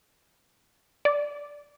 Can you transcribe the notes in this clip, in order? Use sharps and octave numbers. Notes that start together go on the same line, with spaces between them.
D5